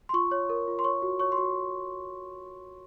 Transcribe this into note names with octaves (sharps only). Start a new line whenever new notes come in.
C6
F4 C#6
C#5
A#4
F4
C6
C#5 C#6
F#4
C#5 C#6
C6
F#4 C#6